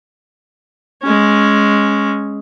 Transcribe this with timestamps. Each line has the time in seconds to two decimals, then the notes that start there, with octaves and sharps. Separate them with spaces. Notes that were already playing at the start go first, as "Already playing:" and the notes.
1.03 G#3 C#4